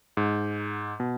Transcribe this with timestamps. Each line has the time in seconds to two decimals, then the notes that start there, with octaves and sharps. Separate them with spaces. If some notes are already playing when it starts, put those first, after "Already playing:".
0.17 G#2
1.00 B2